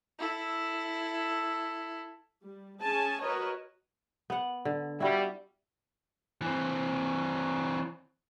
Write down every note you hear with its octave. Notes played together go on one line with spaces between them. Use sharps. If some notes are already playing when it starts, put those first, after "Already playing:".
E4 A4
G3
C#4 G#4 G#5 A5
F#4 A#4 B4 C#5 D#5
B3 F#5
D3
G3 E4 F#4
E3 C4